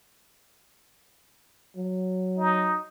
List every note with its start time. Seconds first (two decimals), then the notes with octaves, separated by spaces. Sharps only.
1.76 F#3
2.38 D#4